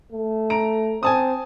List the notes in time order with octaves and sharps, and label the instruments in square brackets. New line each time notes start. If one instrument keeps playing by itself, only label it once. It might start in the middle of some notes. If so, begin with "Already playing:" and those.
[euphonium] A3
[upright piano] A#5 D7
[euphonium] C4 [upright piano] G#5 A5 D#6